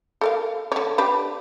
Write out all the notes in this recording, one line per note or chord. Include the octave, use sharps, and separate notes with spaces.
A4 A#4 F5
D3 C#5
D4 G4 B4